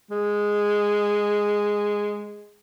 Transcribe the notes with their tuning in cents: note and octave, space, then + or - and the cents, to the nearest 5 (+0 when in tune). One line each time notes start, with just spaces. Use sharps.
G#3 -5